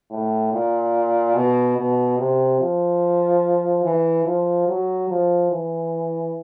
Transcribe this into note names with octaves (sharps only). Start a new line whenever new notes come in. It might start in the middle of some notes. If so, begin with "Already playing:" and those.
A2
A#2
B2
B2
C3
F3
E3
F3
F#3
F3
E3